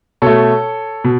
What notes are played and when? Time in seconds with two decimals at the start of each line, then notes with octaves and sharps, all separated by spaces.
0.22 B2 A3 A4 C#5
1.04 B2